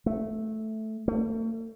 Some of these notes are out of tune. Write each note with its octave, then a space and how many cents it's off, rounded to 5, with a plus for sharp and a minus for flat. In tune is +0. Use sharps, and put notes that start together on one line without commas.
A3 -5
A3 +40